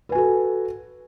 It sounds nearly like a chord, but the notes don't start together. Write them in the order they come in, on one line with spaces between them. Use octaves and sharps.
B4 G#5 F#4 A4